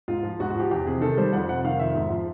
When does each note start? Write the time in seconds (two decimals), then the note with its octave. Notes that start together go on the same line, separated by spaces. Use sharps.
0.08 G#2 F4
0.23 F3
0.40 G#2 F#4
0.50 F#4
0.55 F3 G4
0.71 E2 G4
0.86 C3 G#4
1.01 D#3 A4
1.17 G3 C5
1.33 F2 F#5
1.48 C3 F#5
1.64 D#3 F5
1.79 F2 E5
1.95 G#2
2.10 F3